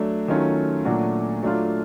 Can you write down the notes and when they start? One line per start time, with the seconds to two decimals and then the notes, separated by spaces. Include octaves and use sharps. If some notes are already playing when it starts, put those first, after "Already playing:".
Already playing: F#3 A3 D4
0.28 D#3 F#3 A3 C#4 F4
0.85 A#2 F#3 A3 D4 F#4
1.43 F#3 A3 D4 F4